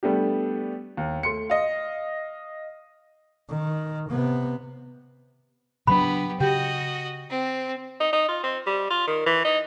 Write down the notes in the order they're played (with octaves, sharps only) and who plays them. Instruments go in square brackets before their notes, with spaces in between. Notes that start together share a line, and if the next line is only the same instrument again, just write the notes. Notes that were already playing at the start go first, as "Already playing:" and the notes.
[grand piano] G3 A3 B3 D4 G4
D#2
A3 C6 C#7
D#5 F5
[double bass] D#3
C3 B3
[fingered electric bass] C#3 F#3 D4 [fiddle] B3 G4 [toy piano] B5
[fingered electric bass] C#3 [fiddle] F#4 D#5 [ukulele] G4
[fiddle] C4
[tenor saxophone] D#4
D#4
F4
C4
G3
F4
D#3
E3
D#4